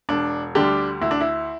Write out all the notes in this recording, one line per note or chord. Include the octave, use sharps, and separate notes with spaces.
E1 D4
D2 D3 G3 D4 G4
D2 E4
D4
E4